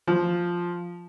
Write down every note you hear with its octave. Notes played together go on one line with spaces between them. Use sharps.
F3